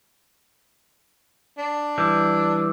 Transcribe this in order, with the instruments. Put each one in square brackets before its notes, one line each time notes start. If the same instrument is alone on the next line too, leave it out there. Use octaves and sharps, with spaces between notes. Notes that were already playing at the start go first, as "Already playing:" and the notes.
[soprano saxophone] D4
[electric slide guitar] E3 G3